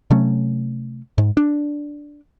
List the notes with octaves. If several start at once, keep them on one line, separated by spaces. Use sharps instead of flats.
C3 F#3 A3 C#4
G#2
D4